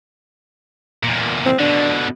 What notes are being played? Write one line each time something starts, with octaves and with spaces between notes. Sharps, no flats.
E2 A#2
C4
B2 D3 D4